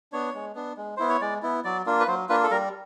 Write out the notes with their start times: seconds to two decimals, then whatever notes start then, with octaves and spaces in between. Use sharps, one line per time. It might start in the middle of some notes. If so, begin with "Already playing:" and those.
0.12 B3 D4 C#5
0.35 G#3
0.55 B3 D4
0.77 G#3
0.97 B3 E4 C5
1.09 C#5
1.21 G#3 D5
1.43 B3 E4
1.64 F#3 D5
1.86 A#3 D4 F4
2.00 B4
2.08 F#3 C5
2.29 A#3 D4 F4 B4
2.43 A4
2.51 G3 A#4